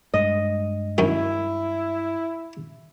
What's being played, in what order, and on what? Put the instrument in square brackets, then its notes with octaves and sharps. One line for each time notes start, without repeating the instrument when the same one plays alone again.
[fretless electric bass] G2 G3 G#3 [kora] D#5
[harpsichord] F#2 D#3 F#4 [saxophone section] E4